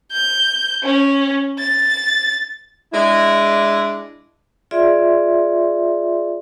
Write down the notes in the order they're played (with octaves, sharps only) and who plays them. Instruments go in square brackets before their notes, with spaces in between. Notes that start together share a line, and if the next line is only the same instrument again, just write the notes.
[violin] G6
C#4
A6
[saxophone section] G#3 D4 E4
[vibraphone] F4 G#4 D5 E5 C6